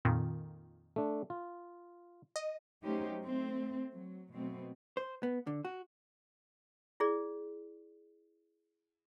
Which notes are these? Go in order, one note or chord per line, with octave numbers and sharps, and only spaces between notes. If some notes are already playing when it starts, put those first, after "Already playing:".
F2 A#2 D#3
A3 D4
F4
D#5
F#3 A3 C#4 D#4 G4 C5
A3 C4
F#3
B2 F#3 A3 C4
C5
B3
D3
F#4
E4 G#4 D5